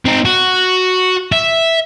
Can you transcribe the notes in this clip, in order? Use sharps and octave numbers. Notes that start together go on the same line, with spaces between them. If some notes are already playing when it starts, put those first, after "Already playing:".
C4 D#4
F#4
E5